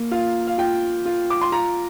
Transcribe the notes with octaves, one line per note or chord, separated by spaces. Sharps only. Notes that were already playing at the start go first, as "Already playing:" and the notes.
Already playing: A#3
F4 F5
F5
F4 G5
F4
D6
C6
F4 A#5